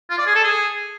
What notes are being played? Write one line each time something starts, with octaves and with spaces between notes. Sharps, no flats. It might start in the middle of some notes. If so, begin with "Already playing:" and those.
F4
D5
G#4
A4
G#4